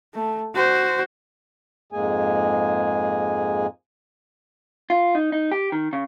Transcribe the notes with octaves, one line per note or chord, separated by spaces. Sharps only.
A3
F#4 C5
F2 G#2 G#3 A#3 G#4 G#5
F4
D#4
D#4
G4
D#3
C#3